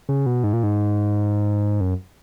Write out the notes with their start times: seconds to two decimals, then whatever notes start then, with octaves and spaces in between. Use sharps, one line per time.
0.09 C#3
0.26 B2
0.44 G#2
0.53 A#2
0.63 G#2
1.81 F#2